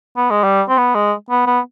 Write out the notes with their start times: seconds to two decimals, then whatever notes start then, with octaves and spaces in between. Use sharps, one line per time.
0.17 B3
0.30 G#3
0.44 G3
0.69 C4
0.78 B3
0.95 G#3
1.30 B3
1.47 B3